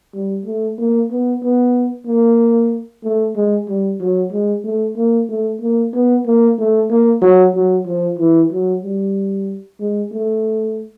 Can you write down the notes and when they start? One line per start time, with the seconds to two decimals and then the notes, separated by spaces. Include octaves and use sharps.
0.14 G3
0.45 A3
0.78 A#3
1.11 B3
1.43 B3
2.06 A#3
3.04 A3
3.35 G#3
3.68 G3
4.01 F#3
4.32 G#3
4.64 A3
4.96 A#3
5.29 A3
5.61 A#3
5.93 B3
6.26 A#3
6.58 A3
6.90 A#3
7.22 F#3
7.55 F#3
7.86 F3
8.19 E3
8.51 F#3
8.83 G3
9.80 G#3
10.11 A3